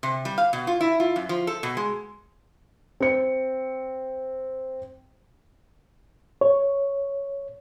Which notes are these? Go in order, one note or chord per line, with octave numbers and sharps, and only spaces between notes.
C3
G3
F5
B2
F4
E4
F4
F#2
F3
A4
B2
G#3
C4 C#7
C#5